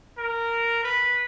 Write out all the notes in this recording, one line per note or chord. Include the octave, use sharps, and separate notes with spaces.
A#4
B4